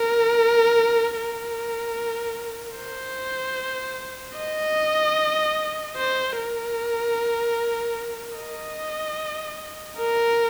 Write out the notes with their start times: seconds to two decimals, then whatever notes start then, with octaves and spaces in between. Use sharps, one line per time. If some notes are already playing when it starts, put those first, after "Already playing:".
Already playing: A#4
1.17 A#4
2.76 C5
4.37 D#5
5.97 C5
6.37 A#4
8.37 D#5
9.97 A#4